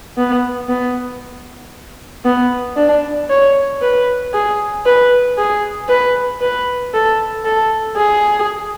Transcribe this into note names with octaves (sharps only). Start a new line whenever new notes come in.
B3
B3
B3
D4
C#5
B4
G#4
B4
G#4
B4
B4
A4
A4
G#4